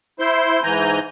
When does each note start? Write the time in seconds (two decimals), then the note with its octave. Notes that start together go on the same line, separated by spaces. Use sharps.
0.20 E4 C5 C6
0.63 G#2 E3 G#5 A#5 G6